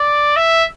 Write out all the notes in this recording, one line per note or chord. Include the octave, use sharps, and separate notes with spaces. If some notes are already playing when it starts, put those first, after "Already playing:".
Already playing: D5
E5